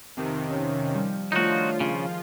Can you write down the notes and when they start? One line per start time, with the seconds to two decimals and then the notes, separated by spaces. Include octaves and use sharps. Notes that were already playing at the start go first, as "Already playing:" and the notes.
0.17 F2 C3 D#3
0.49 C#4
0.94 F3 G3
1.32 D#3 F3 A3 D4 D#4 F4 F#4 C#5
1.80 C#3 G#4